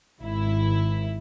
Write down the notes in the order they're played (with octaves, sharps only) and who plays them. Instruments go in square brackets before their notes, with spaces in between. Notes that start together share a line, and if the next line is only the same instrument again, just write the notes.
[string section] G#1 E4